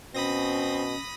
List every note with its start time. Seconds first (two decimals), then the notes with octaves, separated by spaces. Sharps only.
0.15 B2 C4 C#4 B5 D#6 A#6